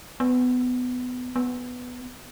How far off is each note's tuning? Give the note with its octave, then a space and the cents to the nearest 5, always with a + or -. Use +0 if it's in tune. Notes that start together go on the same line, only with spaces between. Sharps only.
B3 +20
B3 +5